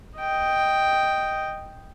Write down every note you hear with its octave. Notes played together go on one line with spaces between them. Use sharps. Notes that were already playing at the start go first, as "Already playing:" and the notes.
D#5 G5